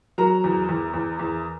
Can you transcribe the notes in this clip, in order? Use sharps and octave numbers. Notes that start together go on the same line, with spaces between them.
F#3 A#4 A#5
E2
E2
E2
E2